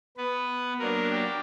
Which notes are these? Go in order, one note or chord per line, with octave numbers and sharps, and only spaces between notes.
B3 B4
F#3 A#3 D4 A#4
G4